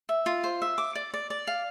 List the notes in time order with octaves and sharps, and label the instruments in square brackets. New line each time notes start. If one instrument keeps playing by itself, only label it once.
[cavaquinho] E5
F4
C5
E5
D6
D5
D5
D5
F5